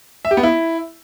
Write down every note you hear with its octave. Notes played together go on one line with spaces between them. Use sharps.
E5
G4
B3
E4